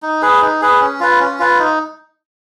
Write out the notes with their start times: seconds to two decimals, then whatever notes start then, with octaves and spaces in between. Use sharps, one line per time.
0.03 D#4
0.22 G#4 B4
0.42 D#4
0.61 G#4 B4
0.80 C#4
1.00 F4 B4
1.20 C#4
1.39 F4 B4
1.59 D#4